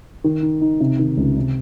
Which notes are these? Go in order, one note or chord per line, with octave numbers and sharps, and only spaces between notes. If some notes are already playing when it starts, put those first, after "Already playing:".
D#3
D#4
D#4
C3
D#3
C#2
C3